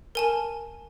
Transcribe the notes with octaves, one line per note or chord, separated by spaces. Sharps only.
A#4 G#5 A5